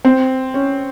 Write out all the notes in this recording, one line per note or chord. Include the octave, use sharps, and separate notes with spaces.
C4
C#4